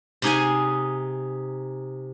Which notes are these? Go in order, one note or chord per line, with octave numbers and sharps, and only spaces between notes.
C3 D#4 G#4 G#5